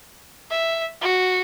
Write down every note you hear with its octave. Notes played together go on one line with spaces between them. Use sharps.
E5
F#4